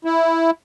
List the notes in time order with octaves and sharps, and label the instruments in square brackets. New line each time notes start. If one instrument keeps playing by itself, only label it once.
[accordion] E4